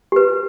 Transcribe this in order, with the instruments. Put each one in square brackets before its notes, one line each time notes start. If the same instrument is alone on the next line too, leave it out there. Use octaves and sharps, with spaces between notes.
[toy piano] G4 B4